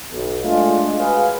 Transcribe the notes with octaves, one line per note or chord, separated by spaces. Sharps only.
B1
G#3 A3 D4 F4
F#4 G#4 B4 C#5 F5